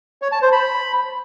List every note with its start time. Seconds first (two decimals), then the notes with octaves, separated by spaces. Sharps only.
0.22 C#5
0.32 A5
0.42 C5
0.52 B5